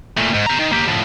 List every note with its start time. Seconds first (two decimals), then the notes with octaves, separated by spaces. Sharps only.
0.17 A#2 A3
0.34 G#2
0.46 G4 A#5
0.59 D#3
0.72 A#3 G4
0.87 A2 F3